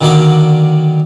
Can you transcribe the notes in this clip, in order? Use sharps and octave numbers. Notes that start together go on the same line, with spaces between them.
D3 D#3 F#3 A#3 D5